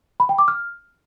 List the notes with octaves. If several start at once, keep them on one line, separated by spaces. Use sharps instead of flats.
B5
G5
D6
F6